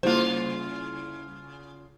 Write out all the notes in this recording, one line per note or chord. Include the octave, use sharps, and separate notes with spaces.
C#3 G3 A#3 E4 F4 C5